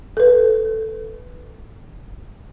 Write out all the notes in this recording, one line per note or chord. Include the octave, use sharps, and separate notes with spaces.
A4 B4